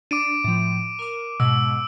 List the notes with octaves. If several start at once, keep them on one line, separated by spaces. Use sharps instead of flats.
D4 D6 D7 D#7
A2 F3
A#4 D6
G#2 B2 G#3 E6